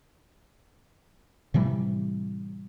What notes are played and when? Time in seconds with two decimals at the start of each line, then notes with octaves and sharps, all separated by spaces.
1.54 A2 C3 E3 G3